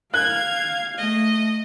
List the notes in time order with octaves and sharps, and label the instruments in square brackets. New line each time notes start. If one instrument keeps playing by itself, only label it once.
[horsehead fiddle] F5 [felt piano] F#6 [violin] G#6
[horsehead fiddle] A3 [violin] D#5